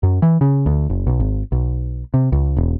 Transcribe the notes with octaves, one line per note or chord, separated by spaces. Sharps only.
F#2
E3
C#3
D2
F#1
B1
G#1
B1
C3
C#2
E1